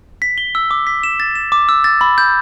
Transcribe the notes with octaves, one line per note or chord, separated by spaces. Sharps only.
B6
G7
E6
D6
B6
E7
A6
E7
D6
E6
A6
B5
G6